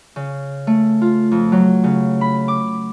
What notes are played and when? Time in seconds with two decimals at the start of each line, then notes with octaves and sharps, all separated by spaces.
0.16 C#3
0.67 A3
1.01 F4
1.31 F2
1.52 F#3
1.84 C#3
2.21 B5
2.48 D6